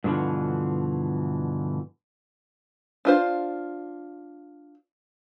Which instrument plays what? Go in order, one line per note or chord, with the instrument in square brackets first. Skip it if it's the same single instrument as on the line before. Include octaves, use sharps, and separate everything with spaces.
[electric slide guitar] G2 B2 D3 E3 F3
[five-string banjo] D4 F4 C5